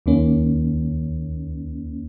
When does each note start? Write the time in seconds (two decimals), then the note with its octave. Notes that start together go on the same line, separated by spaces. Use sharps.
0.06 D#2 D#3 A#3 C#4